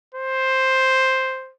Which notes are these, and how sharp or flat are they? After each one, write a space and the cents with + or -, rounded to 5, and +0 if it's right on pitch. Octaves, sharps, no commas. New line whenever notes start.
C5 +5